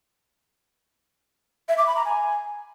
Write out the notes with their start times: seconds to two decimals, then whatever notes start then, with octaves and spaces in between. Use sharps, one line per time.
1.69 E5
1.78 D6
1.87 B5
1.96 A#5
2.05 G#5